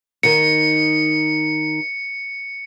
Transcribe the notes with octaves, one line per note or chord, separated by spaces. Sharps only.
D#3 D#4 C#7